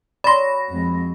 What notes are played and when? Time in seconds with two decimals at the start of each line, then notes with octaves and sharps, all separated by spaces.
0.24 F#3 D5 B5 C6 A#6
0.69 F2 G#3